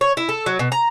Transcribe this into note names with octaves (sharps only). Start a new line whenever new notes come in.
C#5
E4
A4
F#3
B2
A#5